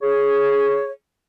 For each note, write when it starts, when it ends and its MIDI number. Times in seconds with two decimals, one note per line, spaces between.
0.02 0.90 68
0.02 0.90 73